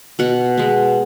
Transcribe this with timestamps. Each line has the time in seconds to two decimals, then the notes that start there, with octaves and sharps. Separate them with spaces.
0.19 B2 F#5
0.57 G#3 B3